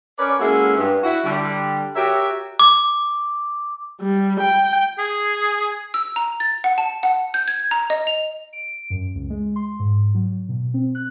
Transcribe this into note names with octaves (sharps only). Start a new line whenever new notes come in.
C#4 A#4 B4 C#5 D5
G#3 A#3 C#4 E4 F#4 A4
G2
E4 F#4
D3 G3
F#4 G4 A#4 C#5 E5
D6
G3
G5
G#4
E6
A#5
A6
F#5
A5
F#5
G6
G#6
A#5
D#5
F7
D7
F#2
C#2
G#3
C6
G#2
F#3
B2
C4
F#6